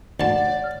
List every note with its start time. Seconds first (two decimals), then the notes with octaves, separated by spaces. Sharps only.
0.20 D2 D5 F#5 A5
0.46 C#5
0.64 F6